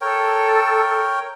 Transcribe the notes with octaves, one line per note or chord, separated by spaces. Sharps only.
A4 A#4 C#5 G5